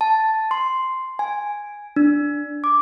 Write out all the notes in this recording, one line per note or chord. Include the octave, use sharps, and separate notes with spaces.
A5
C6
G#5
D4
D6